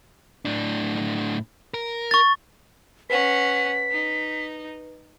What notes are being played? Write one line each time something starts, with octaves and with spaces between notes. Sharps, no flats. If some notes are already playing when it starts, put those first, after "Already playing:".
A2 D4
A#4
C#6 A6
C#4 B4 F#5 B6
D#4